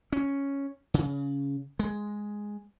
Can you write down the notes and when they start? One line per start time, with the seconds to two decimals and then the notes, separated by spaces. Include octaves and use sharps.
0.12 C#4
0.94 C#3
1.79 G#3